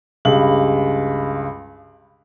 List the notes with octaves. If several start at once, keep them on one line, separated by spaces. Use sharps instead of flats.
C#2 G2 F#7